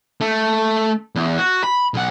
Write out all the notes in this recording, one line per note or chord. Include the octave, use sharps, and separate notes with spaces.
A3
E2
F#4
B5
B1 F#5